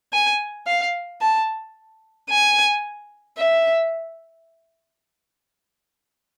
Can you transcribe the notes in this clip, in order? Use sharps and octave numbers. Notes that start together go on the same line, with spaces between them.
G#5
F5
A5
G#5
E5